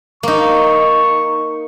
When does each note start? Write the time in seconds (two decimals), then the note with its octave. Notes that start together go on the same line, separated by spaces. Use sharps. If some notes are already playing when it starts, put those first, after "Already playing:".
0.23 A#3 D#4 C#6